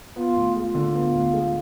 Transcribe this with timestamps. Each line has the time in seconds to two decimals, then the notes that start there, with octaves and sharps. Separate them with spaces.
0.16 B3 F4
0.36 D2
0.56 G#3 F4
0.75 D3
0.95 B3
1.14 D2
1.34 G#3